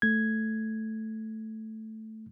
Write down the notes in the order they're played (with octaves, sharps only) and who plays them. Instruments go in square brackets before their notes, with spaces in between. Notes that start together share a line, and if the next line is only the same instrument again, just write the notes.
[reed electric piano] A3 G#6